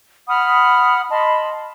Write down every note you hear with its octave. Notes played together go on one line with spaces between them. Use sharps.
F#5 B5 D#6 F6
D#5 A5 B5 C6